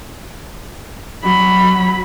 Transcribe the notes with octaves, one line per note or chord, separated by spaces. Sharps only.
F#3 B5